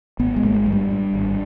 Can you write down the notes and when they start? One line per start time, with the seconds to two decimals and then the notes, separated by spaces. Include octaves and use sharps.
0.19 G#1 B3
0.36 G#3
0.43 G#1 A#3
0.55 G#3
0.66 G2
0.72 G3
0.90 G2
1.14 G#1